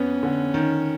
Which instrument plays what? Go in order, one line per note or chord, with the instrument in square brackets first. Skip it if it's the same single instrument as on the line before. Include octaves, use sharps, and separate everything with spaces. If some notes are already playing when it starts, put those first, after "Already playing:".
Already playing: [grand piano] F2 B3 [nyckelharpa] C#4
[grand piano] D3
D#3